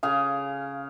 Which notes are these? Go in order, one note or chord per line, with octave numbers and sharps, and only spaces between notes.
C#3 G#4 F5